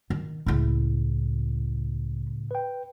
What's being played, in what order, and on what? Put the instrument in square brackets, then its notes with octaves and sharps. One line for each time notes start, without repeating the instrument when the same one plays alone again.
[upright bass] D#3
[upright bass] C#2 E4 [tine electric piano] A2 C#3
[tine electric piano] B4 G5